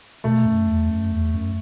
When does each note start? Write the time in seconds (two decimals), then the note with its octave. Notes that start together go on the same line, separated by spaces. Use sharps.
0.24 B2 A3
0.45 F#2
0.67 E2
0.89 F#2
1.11 E2
1.34 F#2